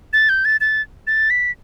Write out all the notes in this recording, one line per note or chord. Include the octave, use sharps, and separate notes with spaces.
A6
G6
A6
A6
A6
B6